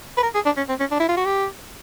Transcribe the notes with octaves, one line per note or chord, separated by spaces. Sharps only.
B4
A#4
G#4
D4
C#4
C4
C#4
D4
E4
F4
F#4
G4